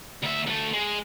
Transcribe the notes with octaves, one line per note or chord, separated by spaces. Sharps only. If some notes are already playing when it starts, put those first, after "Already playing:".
D2 E5
D2 A3
G#3